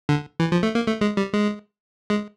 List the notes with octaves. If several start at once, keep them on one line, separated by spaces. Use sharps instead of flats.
D3
E3
F3
A3
A#3
A3
G#3
G3
G#3
G#3